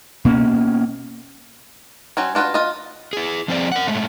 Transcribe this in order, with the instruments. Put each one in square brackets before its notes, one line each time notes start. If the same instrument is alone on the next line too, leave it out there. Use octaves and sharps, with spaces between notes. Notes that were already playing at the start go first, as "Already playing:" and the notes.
[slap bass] B2 A#3 B3 C#4
[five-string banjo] F#3 C4 C#4
D4 F4 F#4 B4
F4 D#5
[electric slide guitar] E4 G#4
F3 C4 G#4 C5 D5
A#4 F#5
A2 G#3 A3